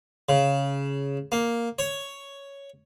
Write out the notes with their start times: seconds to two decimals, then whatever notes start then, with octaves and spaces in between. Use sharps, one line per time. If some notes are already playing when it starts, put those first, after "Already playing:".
0.29 C#3
1.32 A#3
1.79 C#5